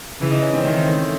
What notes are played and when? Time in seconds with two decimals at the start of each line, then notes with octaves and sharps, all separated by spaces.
0.21 C#3 E3 E4
0.32 D#4
0.43 C#4
0.54 C4
0.64 D#3 C4
0.87 A3